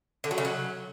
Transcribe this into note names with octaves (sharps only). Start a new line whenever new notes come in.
D3
F#3
C#3
F#3